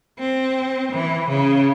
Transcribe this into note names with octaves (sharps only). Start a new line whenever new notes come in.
C4
E3
C#3